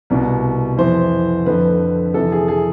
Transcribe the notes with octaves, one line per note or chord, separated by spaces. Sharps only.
C2 B2
F2 E3 C5
F2 D3 B4
F2 C3 E3 A4
G#4
G#4